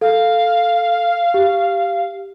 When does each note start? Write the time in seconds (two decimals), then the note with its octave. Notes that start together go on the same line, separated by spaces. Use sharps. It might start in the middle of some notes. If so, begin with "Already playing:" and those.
0.01 A4 F5
1.34 G4